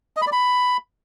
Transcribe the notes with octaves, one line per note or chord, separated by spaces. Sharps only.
D#5
B5
D5
B5